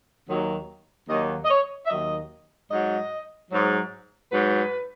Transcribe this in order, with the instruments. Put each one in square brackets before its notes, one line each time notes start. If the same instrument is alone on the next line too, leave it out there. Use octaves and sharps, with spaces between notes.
[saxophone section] D#2 D#3 F#3
D#2 D#3 F#3 D#5
D#5
C#5
E5
D#2 D#3 F#3 D#5
G#2 F#3 D#5
G#2 F#3
G#2 F#3 B4